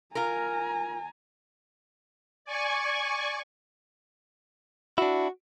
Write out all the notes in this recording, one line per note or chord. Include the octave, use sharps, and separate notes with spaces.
F4 A#4 G#5 A#5
D5 G#5 C#6
D4 E4 F#4